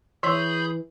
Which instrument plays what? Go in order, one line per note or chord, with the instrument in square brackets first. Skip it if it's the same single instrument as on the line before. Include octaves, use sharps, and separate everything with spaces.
[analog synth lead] E3 [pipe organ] G#4 B5 G6 [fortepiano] C#5 [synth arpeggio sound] C6 E6 B6